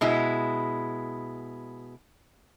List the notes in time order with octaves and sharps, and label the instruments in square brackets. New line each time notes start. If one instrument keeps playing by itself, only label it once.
[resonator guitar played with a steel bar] B2 G#3 E4